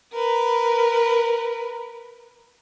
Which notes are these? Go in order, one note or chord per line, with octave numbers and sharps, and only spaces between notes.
A#4 B4